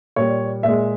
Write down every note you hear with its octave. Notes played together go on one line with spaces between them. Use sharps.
A#2 G3 C#5
A#2 G#3 E5